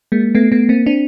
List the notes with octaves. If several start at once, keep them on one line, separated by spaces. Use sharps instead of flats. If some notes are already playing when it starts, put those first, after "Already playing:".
G#3 A#3
A3 B3
A3 B3
A#3 C4
C4 D4